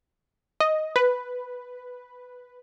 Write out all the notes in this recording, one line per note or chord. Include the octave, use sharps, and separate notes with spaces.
D#5
B4